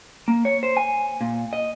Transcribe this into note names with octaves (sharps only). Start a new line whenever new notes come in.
A#3
C#5
C5
G#5
A#2
D#5